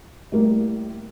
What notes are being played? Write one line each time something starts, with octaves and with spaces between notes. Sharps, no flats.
A2 G3 A#3